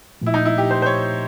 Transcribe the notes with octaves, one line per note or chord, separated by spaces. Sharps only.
A#2 F3 A3 E4
D#4
E4
G4
C5
C5
C#5